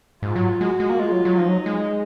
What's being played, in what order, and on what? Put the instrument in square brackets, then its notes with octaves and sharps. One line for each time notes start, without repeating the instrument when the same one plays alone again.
[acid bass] G#2 [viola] F4
[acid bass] F#3
[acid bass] G#3 [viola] F#4
[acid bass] G#3
A#3
[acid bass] G#3 [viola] F4
[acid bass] F#3
F#3
[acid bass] F3 [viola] D#4
[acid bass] F#3
G#3